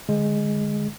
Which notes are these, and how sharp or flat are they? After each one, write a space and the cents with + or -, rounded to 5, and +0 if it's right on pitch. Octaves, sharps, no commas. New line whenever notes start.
D3 +25 G#3 +0